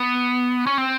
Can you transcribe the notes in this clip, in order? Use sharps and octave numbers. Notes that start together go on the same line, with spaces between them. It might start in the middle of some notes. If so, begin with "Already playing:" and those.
Already playing: B3
C#4
C4